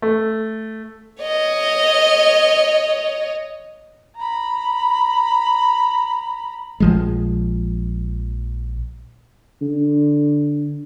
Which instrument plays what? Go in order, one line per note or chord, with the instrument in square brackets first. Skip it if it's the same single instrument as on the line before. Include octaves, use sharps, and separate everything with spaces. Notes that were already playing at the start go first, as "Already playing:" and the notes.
[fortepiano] A3
[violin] C#5 D#5
[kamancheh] A#5 B5
[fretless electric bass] A#1 F3 G#3
[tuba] D3